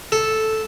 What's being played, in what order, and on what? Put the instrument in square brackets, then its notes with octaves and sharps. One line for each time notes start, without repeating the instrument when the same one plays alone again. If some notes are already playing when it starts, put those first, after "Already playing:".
[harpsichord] A4